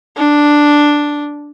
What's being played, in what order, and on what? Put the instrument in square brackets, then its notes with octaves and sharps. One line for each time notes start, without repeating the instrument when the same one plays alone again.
[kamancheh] D4